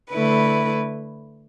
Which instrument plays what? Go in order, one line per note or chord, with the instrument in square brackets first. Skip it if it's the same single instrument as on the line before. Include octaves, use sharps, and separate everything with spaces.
[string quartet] D3 A3 E4 B4